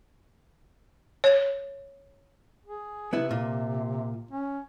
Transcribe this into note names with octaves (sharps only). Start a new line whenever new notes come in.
C#5
G#4
C3 B3 E4
A#2
C#4